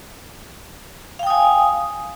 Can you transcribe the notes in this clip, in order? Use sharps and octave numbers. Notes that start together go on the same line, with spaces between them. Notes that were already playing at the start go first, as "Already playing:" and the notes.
F5 G5 G#5 D#6